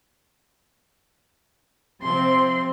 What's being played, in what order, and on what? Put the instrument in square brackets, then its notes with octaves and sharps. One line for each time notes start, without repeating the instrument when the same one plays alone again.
[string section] C3 F3 C4 [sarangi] C6